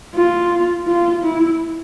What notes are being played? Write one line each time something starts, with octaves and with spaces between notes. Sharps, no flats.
F4
F4
E4